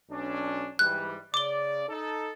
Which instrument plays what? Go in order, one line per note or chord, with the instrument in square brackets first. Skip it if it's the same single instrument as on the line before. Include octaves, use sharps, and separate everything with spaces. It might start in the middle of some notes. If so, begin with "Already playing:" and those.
[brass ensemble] B1 C#4 D4
[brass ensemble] G#2 E3 G3 [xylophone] F#6
[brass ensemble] C#3 D5 [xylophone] D6 G7
[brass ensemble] D#4 A4